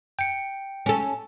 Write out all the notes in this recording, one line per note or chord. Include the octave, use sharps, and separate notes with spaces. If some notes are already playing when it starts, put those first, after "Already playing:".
G5 C#7
C#4 A4